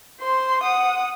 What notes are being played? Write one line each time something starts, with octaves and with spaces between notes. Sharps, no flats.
C5 C6
F#5 D#6